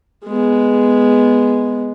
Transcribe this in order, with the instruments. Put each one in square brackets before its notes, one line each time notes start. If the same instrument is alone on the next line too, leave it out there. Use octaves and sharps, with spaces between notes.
[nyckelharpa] G#3 B3